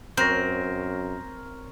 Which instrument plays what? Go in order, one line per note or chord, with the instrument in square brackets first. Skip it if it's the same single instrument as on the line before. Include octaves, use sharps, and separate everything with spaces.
[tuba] F#2 [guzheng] C4 [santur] A#4 C#5 [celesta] G6 A#6